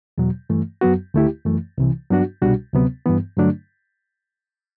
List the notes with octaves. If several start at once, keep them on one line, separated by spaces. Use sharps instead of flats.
E2 B2 F#3
G2 E3 A3
F#2 F#3 B3 F#4
D2 D3 A3 E4 G4
F#2 E3 A3
C2 C3 E3
G2 F#3 B3 D4 F#4
C2 B2 G3 D4 F#4
D2 C3 F#3 B3
G2 E3 B3
G2 D3 F#3 A3 D4